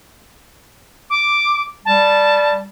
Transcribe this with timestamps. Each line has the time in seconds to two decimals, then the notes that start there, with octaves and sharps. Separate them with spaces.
1.10 D6
1.85 G3 A5